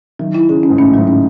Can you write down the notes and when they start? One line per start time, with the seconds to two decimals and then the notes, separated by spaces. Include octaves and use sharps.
0.19 D#3 F#3
0.34 E4
0.49 C#3 G#4
0.63 C#4
0.70 G#2
0.78 A2 C#4
0.94 G#2 F#3
1.07 C#4